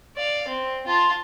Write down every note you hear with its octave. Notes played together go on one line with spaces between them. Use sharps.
D5 F5
C4
F4 A5